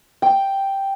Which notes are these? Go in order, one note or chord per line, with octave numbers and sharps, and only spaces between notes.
G5